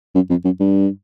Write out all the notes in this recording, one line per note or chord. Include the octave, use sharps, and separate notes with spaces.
F#2
F2
F#2
G2